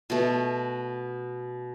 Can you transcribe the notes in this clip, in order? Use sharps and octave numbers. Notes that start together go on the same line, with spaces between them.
B2 A3